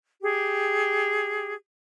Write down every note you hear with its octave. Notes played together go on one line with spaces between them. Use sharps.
G4 G#4